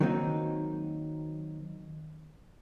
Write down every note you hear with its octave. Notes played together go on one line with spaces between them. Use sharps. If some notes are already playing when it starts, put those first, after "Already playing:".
D#3 F#3 A#3 C4 D#4